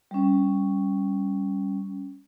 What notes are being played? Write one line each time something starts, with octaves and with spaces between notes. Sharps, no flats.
G3 C#4